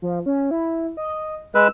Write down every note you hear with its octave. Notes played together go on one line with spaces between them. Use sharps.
F3
C#4
E4
D#5
G#3 B4 E6